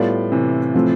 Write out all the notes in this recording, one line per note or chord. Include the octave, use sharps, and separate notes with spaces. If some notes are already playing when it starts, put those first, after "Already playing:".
Already playing: A2 G3 B3 F4 A4 D5
C3 E3
F3 A3 C4